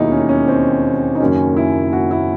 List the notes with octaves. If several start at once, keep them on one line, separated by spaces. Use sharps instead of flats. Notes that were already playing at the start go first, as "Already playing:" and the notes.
Already playing: E1 D#2 D#3 F#3 D#4 E4
C#4
C#4
C4
D#4
F#1 F#2 D#3 F#3 C#4
E4
F#4
E4